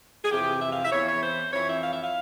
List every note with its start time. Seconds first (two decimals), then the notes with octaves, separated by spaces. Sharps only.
0.25 G#4
0.31 F2 C3 E3 G4
0.62 E5
0.72 F5
0.85 E5
0.92 E2 E3 C#5
1.07 C#5
1.22 C5
1.53 F2 E3 C#5
1.68 E5
1.83 F5
1.92 E5
2.03 F5